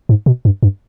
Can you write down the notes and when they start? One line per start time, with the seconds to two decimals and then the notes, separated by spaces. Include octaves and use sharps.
0.09 G#2
0.26 B2
0.45 G2
0.63 G2